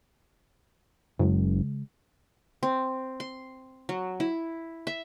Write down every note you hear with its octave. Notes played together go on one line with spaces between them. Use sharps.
F#1 C#3 G#3
C4
C6
F#3
E4
E5